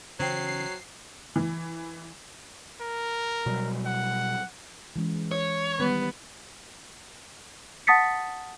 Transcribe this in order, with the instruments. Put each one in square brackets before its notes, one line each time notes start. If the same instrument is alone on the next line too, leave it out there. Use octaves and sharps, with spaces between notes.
[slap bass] C#3 E3 C#4 [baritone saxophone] F#3 [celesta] C5 G5 [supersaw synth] C7
[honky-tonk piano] E3
[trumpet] A#4
[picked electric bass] B2 F#3 G3
[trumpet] F#5
[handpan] E3 G#3 C#4
[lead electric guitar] C#5
[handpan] D#3 G3 [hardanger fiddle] B3
[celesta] F#5 A5 D#6 A6 B6 C#7